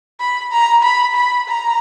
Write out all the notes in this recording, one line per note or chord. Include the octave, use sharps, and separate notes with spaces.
B5
A#5
B5
B5
A#5